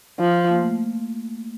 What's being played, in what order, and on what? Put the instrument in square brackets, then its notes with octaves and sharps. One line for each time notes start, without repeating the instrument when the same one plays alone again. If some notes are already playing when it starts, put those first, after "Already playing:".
[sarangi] F3
[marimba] A#3
A3